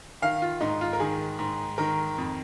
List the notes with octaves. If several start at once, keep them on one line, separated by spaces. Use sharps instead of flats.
D#3 F5
F4
G#2 D#4
F4
A#4
D#3 G#4
G#2
D#3 A#4
F2